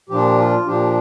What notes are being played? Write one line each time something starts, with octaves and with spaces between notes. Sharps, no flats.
A#2 F3 D4 G4
F4
A#2 F3 D4 G4